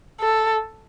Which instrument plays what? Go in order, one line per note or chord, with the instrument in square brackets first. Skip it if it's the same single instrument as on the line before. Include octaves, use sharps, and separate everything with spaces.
[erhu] A4